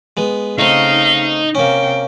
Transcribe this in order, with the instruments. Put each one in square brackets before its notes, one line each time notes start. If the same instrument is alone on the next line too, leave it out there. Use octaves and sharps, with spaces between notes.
[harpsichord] G#3 B3
[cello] C#3 F5 [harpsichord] A3 C4 [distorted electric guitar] D#4
[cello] C3 G5 [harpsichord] A#3 C#4